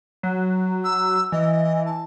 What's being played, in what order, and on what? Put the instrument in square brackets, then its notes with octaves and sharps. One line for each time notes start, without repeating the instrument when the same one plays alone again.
[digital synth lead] F#3
[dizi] E6
[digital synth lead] E3 [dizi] D#5
[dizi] A5